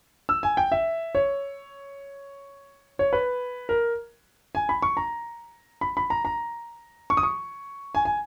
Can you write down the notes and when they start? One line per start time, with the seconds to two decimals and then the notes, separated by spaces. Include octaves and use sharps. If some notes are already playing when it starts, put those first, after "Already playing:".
0.29 E6
0.43 G#5
0.57 G5
0.72 E5
1.15 C#5
2.99 C#5
3.13 B4
3.69 A#4
4.55 G#5
4.69 B5
4.82 C#6
4.97 A#5
5.81 B5
5.97 B5
6.10 A#5
6.25 A#5
7.10 C#6
7.17 D#6
7.23 C#6
7.95 G#5
8.05 G#5